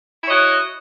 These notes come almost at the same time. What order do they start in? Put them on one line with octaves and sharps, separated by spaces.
E4 C#5 D#5 F#4